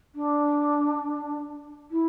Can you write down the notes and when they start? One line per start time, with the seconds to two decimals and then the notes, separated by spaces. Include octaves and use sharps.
0.15 D4
1.91 E4